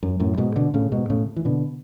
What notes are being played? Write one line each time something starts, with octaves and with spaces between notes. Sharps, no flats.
F#2
F#2 A2
G#2 B2
B2 D3
A2 C#3
G#2 B2
A2 C#3
E3
B2 D3